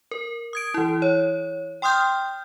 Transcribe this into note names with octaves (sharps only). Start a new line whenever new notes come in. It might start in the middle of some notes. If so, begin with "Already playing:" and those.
A#4
D#6 G#6 D7
E3 E4
C#5
G5 C6 D#6 F6 G6